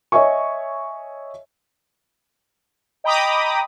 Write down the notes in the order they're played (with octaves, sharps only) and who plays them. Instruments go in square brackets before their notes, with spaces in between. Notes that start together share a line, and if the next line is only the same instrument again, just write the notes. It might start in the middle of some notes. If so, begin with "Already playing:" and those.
[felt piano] C#5 D#5 E5 G#5 C#6
[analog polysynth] D#5 G5 A#5 B5 D6 D#6